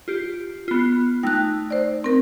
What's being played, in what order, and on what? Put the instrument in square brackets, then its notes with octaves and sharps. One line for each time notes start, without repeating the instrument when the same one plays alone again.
[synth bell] F4 G4
B3 F4
[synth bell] A3 D#4 [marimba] G5 F#6
[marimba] C5 D5
C4 A#4